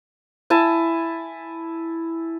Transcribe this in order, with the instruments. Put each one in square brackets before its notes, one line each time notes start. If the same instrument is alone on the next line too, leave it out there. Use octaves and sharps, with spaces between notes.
[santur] E4 G#5 A5